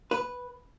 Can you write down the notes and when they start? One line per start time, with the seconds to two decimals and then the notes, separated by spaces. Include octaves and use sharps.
0.11 B4